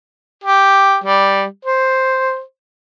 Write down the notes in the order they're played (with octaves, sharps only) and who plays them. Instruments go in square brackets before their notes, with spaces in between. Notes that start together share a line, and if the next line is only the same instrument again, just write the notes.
[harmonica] G4
G3
C5